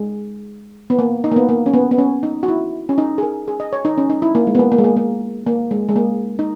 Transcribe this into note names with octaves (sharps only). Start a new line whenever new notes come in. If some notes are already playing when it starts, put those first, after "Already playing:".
Already playing: G#3
B3
A#3
D#4
A#3
B3
A#3
C#4
B3
B3
C#4
D#4
F#4
E4
C#4
D#4
G#4
A#4
G#4
D#5
C#5
D#4
C#4
D#4
E4
A#3
G#3
B3
A#3
A#3
G#3
A#3
A#3
A#3
G#3
G#3
A#3
D#4